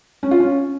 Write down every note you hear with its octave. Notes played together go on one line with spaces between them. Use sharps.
C#4
F4
C#4